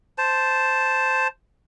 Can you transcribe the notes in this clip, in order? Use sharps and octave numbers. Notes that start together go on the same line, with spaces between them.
C5 A5